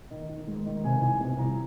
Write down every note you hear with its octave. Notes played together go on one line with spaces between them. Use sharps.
D#3
D#3
G#2
D#3
C3 G#5
C2 G#5
C3 G#5
C2 A#5